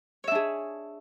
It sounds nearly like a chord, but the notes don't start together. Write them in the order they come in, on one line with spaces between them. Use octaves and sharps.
C#5 E5 D4 G#4